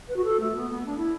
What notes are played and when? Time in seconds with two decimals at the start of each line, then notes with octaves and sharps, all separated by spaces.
0.08 B4
0.16 F#4
0.24 A4
0.40 A3
0.55 B3
0.71 B3
0.86 D4
0.98 E4